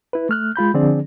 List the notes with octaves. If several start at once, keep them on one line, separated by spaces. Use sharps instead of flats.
E4 B4
A3 F6 F#6
G#3 F4 B5 G6
D3 F3 C4 D4 G#4 D5